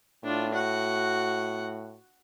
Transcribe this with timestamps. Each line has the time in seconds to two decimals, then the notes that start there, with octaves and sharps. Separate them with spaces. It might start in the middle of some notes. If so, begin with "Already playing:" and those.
0.24 A2 D4 F4
0.54 F#4 F#5